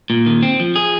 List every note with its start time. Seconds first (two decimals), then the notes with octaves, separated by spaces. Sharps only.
0.10 A#2
0.26 D#3
0.43 C4
0.60 F3
0.76 G#4